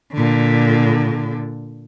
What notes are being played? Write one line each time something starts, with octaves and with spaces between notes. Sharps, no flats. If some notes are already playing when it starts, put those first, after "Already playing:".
A#2 D3